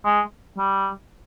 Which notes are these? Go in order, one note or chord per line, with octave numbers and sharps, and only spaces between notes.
G#3
G3